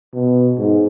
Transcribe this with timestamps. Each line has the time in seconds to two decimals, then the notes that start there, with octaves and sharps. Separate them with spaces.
0.14 B2
0.58 G#2